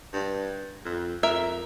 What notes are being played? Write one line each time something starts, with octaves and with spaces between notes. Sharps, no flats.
G2
F2
F2 A#4 E5